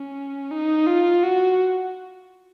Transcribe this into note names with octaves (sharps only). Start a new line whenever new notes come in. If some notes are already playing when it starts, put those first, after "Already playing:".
Already playing: C#4
D#4
F4
F#4